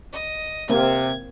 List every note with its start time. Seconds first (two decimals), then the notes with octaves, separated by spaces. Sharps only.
0.13 D#5
0.70 C3 A#3 C4 G#6